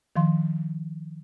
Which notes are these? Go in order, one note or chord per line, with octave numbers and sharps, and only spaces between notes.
D#3 F3 F5 C6